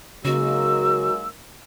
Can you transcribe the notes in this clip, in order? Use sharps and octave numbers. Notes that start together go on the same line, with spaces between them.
C#3 F#3 G#3 A#3 D#4 F#4 E6